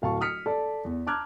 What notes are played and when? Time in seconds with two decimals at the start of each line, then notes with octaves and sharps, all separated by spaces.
0.02 D1 F5 A5 C#6
0.21 D#6 F6 B6 C#7
0.46 A4 D5 A5
0.85 E2
1.07 A5 A#5 D6 F6 F#6 G#6